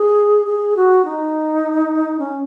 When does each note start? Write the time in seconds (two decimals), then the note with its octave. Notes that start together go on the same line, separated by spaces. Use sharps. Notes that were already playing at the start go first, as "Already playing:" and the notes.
Already playing: G#4
0.47 G#4
0.76 F#4
1.05 D#4
2.19 C#4